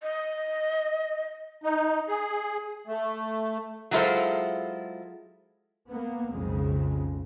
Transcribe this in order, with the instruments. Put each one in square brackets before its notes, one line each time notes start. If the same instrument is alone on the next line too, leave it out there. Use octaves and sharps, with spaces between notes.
[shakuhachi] D#5
[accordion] D#4
G#4
A3
[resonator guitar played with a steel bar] F#3 G#3 E4 F4 A4 C5
[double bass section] A#3 B3
B1 F2 C#3 G#3